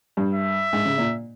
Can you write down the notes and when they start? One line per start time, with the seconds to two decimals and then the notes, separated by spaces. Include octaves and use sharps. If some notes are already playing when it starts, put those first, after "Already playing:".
0.17 G2
0.34 E5
0.73 G#2
0.85 C#3
0.98 A#2